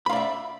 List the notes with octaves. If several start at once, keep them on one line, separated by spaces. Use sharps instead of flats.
D5 E5 F5 B5